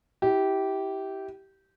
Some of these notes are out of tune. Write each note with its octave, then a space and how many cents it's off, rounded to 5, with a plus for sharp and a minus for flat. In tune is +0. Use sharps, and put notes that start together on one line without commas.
E4 -20 G4 -15